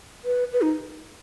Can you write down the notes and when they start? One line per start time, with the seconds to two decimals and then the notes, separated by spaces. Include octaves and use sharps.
0.25 B4
0.53 B4
0.62 D#4